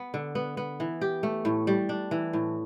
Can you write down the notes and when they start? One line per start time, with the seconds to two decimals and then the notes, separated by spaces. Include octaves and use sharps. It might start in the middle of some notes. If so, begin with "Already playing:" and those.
Already playing: B3
0.14 D3
0.35 B3
0.57 B3
0.80 E3
1.01 G4
1.23 A3
1.45 A2
1.67 G3
1.89 D4
2.11 E3
2.33 A2